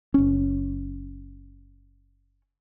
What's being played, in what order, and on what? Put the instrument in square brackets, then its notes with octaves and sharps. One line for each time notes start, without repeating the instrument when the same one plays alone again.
[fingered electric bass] F#1 C#4